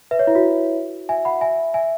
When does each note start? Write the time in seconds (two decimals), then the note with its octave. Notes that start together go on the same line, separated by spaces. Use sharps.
0.11 B4 E5
0.19 C#5
0.27 E4
0.35 F#4
1.09 E5 G#5
1.25 F#5 B5
1.41 E5 G#5
1.74 E5 G#5